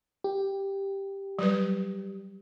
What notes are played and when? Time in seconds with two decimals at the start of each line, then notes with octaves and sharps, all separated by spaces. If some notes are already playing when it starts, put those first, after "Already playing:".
0.24 G4
1.39 F#3 G3 B4